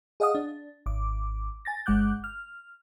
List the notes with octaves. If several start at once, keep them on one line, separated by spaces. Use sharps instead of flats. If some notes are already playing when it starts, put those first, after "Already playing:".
G#4 D#5 F5 F#5 D#6
D4
G#1 D6
G#5 A6 A#6
G1 G#3 F#5 D6 F#6 G6
F6